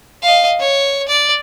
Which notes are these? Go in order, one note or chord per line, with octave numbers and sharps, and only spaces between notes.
D#5 F5
C#5
D5